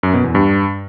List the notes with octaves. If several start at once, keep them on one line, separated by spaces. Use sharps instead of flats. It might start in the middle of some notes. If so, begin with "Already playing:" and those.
F#2
B2
E2
G2